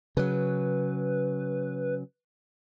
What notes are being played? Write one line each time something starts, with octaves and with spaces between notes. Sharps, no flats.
C#3 F#3 B4